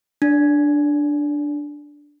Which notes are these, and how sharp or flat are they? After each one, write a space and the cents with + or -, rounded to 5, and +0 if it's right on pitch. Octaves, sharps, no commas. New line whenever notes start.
D4 +0 D5 -35